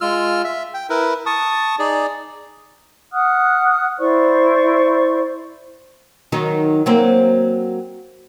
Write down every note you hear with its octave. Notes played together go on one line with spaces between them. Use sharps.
G#3 F4 E6 F6
E5
G5
E4 A#4 B4
A5 C#6 D#6
D#4 G#4 D5
F#5 D#6 F6 F#6
E4 C5 D5 C#6
D#3 F#3 D#4
F#3 A#3 C4